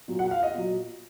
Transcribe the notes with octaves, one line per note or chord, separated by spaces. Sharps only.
A#2 F#3
F#5
F5
D#5
A#2 F#3